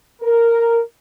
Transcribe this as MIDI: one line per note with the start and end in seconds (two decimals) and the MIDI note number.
0.22 0.79 70